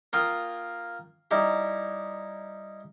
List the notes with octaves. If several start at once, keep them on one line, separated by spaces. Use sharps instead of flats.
A#3 F4 G5 D#6
G3 D#4 E4 G4